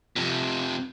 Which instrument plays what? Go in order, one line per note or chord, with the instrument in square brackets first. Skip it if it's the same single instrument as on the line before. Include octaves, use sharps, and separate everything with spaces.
[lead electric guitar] F2 C3